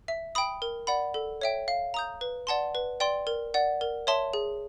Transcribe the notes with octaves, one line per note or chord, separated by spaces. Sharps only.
E5
G5 B5 D#6
A#4
D5 F#5 B5
A4
C#5 E5 G5
F5
A#5 D#6 G6
B4
D5 F#5 A5 C6
B4
D5 G5 C6
A#4
D5 F#5
A#4
C#5 E5 A5 C6
G#4